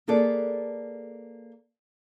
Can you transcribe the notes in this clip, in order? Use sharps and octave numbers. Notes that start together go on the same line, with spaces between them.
A#3 G#4 A4 B4 D5